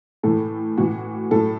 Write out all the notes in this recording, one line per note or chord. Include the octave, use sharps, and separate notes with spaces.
A2 E3 A4
A2 E3 F#4
A2 F#3 A4